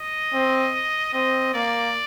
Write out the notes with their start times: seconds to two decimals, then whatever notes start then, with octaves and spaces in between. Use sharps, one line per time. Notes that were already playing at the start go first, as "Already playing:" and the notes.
Already playing: D#5
0.33 C4
1.13 C4 D#5
1.54 A#3 D5